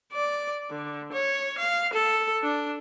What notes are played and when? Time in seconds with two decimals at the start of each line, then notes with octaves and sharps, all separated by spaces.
0.13 D5
0.70 D3
1.12 C#5
1.58 F5
1.94 A4
2.43 D4